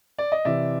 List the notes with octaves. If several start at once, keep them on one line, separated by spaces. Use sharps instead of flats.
D5
D#5
C3 E3 D5 E5